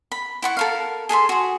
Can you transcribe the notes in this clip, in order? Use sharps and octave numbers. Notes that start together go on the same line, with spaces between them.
B5
E4 F#5 C#6
A4 A#4 F5
G#4 A4 E5 C6
F#4 G#4